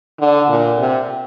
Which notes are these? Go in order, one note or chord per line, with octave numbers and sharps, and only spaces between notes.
D3
A#2
C3